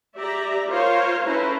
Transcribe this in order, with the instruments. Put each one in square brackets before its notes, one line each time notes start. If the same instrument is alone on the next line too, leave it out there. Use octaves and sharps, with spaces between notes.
[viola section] G4 D5 E5 A#5
F4 A#4 C5 C#5 F5
C#4 E4 A4 B4 C5 A#5